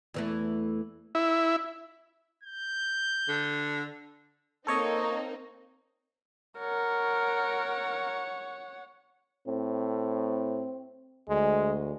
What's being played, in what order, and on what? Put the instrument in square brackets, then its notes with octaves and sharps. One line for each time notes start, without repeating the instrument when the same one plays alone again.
[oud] E2 E3 A3
[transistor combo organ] E4
[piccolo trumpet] G6
[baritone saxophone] D3
[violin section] A#3 C4 D#4 [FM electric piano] A4 C#5 D#5
[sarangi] A#4 [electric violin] C#5 F#5
[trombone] A2 [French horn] C4
[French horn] D2 [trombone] G#3